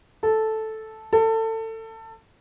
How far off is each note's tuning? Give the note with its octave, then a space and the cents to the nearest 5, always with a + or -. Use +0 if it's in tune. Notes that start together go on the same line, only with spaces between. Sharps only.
A4 -5
A4 +25